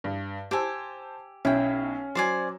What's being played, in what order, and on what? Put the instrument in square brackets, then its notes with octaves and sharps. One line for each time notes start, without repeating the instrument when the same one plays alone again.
[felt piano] G2
[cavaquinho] G4 G#5 [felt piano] C5 A5 E6
[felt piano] B1 [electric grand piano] C#4 [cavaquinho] E4 G5
[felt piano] F#3 [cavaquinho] C5 D5 G#5